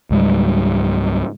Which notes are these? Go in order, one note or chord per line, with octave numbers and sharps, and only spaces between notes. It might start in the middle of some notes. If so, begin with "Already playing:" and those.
C#2 G#2 F#3 G3